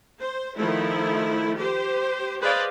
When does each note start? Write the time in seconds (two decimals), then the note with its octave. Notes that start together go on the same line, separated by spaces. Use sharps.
0.19 C5
0.56 D#3 F3 A3 E4
1.57 G4 C5
2.40 G#4 B4 C5 D5 D#5 F5